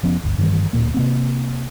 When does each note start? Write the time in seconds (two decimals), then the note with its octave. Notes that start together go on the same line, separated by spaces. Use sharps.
0.03 F1 F3 B3 C#4
0.23 G1 D2
0.38 G2 D#3 E3 G3
0.73 D1 C#2 A#2 A#3
0.94 C3 A#3 C4